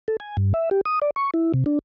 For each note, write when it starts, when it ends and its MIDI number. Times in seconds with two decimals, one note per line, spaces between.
0.08 0.17 69
0.20 0.37 80
0.37 0.53 43
0.54 0.69 76
0.71 0.81 67
0.85 0.99 87
1.02 1.10 74
1.16 1.31 85
1.34 1.52 64
1.54 1.64 48
1.66 1.79 62